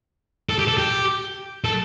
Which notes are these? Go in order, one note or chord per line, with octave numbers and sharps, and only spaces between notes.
A4
G4
A4
G4
A4